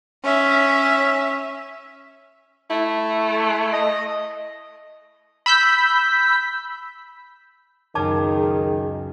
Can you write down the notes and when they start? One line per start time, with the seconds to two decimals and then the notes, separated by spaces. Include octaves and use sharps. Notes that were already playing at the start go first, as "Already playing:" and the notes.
0.24 C#4 E5
2.70 A3 E4
3.73 D#5
5.46 B5 E6 G6 B6
7.95 C#2 F#2 D#3 D#4 G#4 A5 D6